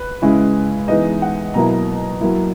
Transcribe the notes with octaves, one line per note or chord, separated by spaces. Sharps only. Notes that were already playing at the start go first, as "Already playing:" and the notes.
Already playing: B4
C#3 G#3 C#4 E4
E3 G#3 B3 D#4 D#5
F#5
B2 F#3 A#3 E4 A#5
F#3 A#3 E4